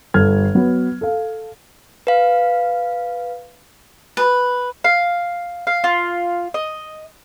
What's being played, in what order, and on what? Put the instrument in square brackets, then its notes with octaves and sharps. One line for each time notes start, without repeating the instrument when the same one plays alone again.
[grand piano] G1 A4 F6 G#6
F#3 B3
A4 F5
[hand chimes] B4 F5
[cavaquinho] B4
[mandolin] F5
F5
F4
D#5